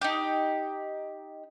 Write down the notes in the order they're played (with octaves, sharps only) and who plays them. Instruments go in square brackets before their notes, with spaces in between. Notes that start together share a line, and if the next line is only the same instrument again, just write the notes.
[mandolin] D#4 G4